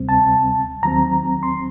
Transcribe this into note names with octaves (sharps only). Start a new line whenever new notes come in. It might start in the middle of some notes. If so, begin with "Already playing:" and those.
Already playing: D2 C3 G3 C4
A5
D#2 D#3 F#3 C4 A#5
C6